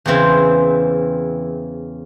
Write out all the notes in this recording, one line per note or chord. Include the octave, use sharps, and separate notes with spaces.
E2 C#3 E3 C4